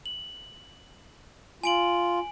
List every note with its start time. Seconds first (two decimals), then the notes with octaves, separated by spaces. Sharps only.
0.06 F#7
1.64 F4 G#5 D7 F#7